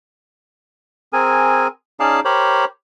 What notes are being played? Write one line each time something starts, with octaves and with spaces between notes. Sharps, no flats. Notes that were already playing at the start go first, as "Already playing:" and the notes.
C4 G#4 A#4 G#5
C#4 D#4 G#4 D5 F5 A5
G4 A#4 C5 C#5 B5